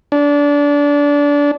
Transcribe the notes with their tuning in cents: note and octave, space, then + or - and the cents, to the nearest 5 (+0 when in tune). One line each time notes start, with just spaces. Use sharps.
D4 -25